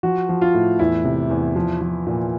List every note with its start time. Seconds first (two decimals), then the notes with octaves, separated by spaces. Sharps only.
0.03 F3 F#4
0.29 F3
0.41 F4
0.54 A2
0.79 E2 E4
1.04 C3
1.30 E2
1.55 F3
1.81 F3
2.06 A#2